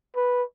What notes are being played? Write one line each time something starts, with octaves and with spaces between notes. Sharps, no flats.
B4